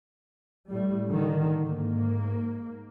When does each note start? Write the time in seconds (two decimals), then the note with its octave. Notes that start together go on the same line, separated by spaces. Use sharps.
0.71 A2 G3
1.08 D3 D#3
1.64 G#2 A#3